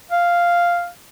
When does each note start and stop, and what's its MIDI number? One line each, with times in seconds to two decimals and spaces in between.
0.11 0.89 77